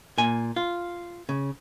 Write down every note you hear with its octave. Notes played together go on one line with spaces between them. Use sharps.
A#2 G#5
F4
C#3